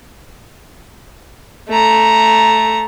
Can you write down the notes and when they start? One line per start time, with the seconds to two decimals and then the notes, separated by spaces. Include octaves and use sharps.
1.69 A3 A#5